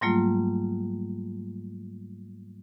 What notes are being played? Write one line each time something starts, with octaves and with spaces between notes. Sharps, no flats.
G#2 F#3 G3 A3 A#3 F4